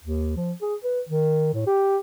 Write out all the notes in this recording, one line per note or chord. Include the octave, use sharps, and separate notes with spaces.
D#2
F3
G#4
B4
D#3
A2
G4